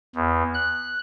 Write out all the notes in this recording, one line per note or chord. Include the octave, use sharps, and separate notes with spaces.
E2
F#6